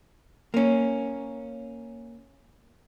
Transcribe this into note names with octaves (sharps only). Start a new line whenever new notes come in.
A#3 C#4